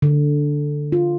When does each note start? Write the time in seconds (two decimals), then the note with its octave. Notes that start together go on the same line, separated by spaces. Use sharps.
0.02 D3
0.92 F4